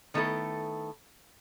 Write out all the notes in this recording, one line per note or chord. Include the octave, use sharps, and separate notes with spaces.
D#3 A3 B3 E4 A4